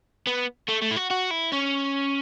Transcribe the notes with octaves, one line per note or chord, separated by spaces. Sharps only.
B3
A3
A3
E4
F#4
F#4
E4
C#4